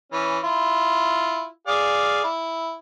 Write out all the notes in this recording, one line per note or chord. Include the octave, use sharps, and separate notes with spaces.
E3 C#4
E4 F4
G#4 D5 F5
E4